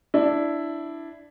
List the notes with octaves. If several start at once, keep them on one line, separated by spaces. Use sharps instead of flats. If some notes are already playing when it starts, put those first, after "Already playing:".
D4 E4